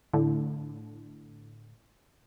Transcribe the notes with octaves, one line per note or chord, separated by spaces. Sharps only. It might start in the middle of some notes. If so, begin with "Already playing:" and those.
A2 D3